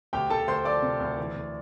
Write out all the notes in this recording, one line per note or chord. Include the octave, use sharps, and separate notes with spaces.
D2 G4 G5
D2 A4 A5
D2 C5 C6
F3 D5 D6
C3
D2
E3
D2